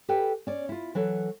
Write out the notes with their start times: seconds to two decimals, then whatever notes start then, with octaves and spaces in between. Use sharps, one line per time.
0.09 G4 A4 B4 G5 G#5
0.47 C#4 D5
0.69 E4 F4
0.95 E3 F#3 A4